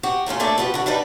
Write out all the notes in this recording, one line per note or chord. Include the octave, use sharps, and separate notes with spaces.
F#4 G4
A3 A#3 C#4 F4
A3 A#3 D4 A4 D5 E5
F3 F#4 G4 B4
D3 F#4
G3 D4 D#4 B4